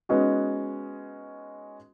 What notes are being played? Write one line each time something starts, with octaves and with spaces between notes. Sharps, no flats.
G#3 B3 C#4 D#4 F#4